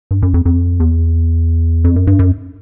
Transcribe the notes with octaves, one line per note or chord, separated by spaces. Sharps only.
G2
F#2
F2
F2
E2
F2
F#2
G2
F#2